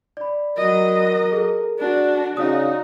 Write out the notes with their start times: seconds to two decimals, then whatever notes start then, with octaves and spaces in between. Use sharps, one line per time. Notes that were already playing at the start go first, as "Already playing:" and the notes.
0.17 D5 B5
0.57 F#3 A#4 D#5
1.32 G#4 A4
1.78 D4 F#4
2.37 C#3 D#4 F#4 D5 F5 D#6